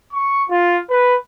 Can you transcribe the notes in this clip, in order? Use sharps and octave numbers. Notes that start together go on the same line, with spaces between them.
C#6
F4
B4